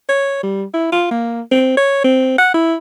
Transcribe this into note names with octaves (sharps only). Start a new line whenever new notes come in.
C#5
G3
E4
F4
A#3
C4
C#5
C4
F#5
E4